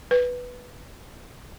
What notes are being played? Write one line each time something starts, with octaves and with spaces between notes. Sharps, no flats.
B4